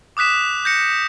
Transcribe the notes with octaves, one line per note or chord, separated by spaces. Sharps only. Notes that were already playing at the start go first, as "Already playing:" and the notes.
D6 D#6 F#6 B6 E7
G6 A#6 C#7